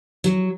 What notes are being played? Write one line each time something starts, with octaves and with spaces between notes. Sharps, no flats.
F#3